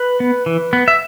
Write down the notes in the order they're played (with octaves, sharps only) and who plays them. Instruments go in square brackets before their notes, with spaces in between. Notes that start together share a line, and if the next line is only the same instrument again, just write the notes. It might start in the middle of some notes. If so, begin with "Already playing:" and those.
Already playing: [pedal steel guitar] B4
B3
E3
B3
E5